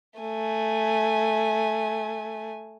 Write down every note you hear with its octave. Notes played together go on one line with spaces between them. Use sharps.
A3 G#5